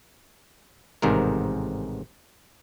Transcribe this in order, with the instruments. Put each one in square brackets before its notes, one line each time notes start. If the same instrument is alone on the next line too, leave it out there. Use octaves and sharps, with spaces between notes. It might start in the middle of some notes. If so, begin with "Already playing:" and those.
[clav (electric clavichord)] A1 G#2 C3 D#3 A#4